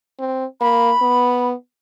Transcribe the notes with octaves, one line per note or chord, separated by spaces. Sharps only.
C4
A#3 B5
B3